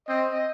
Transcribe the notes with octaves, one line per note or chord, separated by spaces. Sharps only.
C4 D#5
D#5